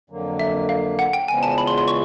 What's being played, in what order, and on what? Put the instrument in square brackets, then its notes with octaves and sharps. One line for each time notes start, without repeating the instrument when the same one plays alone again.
[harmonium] F2 D3 F#3 A#3
[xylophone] E5
F5
F#5
G5
[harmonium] E2 C#3 F3 G#3 B3 [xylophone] G#5
[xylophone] A5
B5
C6
C6
C#6